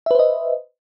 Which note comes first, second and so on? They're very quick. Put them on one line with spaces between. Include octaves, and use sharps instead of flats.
E5 B4 C5 D#5